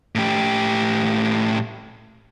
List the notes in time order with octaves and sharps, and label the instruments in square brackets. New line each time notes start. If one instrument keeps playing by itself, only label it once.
[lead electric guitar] A2 G4